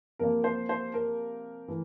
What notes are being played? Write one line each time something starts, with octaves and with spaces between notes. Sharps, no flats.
C3 F3 A#3 A#4
C5
C5
A#4
E3 A3